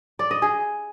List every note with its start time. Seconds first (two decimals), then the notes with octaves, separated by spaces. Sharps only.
0.19 D5
0.31 D#5
0.42 G#4